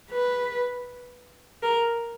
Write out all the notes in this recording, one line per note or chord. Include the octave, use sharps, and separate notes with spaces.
B4
A#4